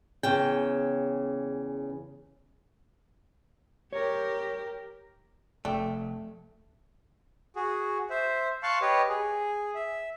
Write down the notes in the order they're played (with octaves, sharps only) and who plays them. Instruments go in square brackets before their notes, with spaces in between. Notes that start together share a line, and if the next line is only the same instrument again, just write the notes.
[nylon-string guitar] E2 C#3 G5
[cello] G4 A#4 [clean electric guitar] C#5
[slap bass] F1 [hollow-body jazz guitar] A3 [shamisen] D4 [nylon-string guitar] G5
[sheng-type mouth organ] F#4 G#4
C5 E5
F5 A5 C6 C#6 F#6
G4 B4 C#5 D#5
G#4
E5